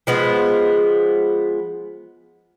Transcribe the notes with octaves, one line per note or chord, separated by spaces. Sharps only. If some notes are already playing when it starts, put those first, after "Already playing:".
F3 G#3 B3